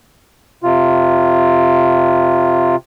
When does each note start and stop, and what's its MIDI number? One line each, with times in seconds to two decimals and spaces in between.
0.63 2.76 48
0.63 2.76 65